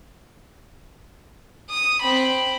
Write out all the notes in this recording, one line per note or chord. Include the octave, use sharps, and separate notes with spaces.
D#6
C4 B5